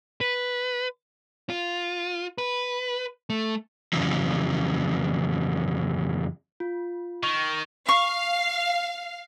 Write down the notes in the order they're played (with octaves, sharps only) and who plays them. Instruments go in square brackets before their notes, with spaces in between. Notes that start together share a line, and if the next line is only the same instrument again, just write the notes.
[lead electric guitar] B4
F4
B4
A3
[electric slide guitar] F2 C#3 E3 F#3
[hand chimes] F4
[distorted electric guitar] D#3 [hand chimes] C#6
[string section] F5 [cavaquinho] C#6